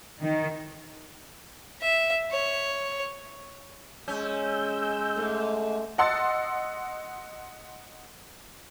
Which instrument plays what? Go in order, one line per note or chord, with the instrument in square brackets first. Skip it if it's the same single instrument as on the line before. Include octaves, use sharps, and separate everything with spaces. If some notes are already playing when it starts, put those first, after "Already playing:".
[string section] D#3
[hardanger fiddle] E5
C#5
[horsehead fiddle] G#3 [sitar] C#4 [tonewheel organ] E6 G6
[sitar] G#2 [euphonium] A3
[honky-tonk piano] D#5 F#5 C6 E6 A6